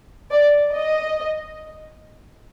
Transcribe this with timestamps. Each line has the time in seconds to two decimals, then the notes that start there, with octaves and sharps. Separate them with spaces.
0.31 D5
0.74 D#5